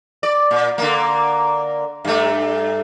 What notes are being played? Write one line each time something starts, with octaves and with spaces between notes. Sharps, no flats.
D5
A#2
D3 A#3
G2 A3